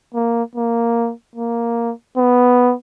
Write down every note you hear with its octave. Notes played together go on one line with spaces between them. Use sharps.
A#3
A#3
A#3
B3